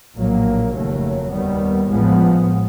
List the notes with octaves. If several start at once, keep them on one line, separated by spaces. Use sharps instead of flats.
A#1 A2 F#3 A#3
F1 D#2 C#3 F#3 A3
D#2 D#3 G3 B3
A1 A2 F3 G#3 B3